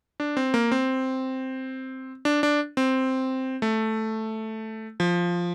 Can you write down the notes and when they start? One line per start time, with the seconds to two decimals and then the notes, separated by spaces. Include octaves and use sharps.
0.20 D4
0.37 C4
0.54 A#3
0.72 C4
2.25 D4
2.43 D4
2.77 C4
3.62 A3
5.00 F3